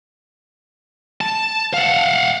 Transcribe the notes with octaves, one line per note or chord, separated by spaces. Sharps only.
A5
F5 F#5